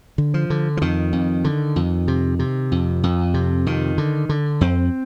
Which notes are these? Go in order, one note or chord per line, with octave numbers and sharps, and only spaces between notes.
D3
F3
D3
F3
F2 D#3
F2
D3
F2
C3
C3
F2
F2
C3
F2 D#3
D3
D3
F2 C4